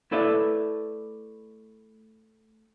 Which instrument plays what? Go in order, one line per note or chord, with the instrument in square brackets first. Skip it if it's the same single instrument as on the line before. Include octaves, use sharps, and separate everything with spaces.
[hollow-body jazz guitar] A3 E4 A4 B4 D5 E5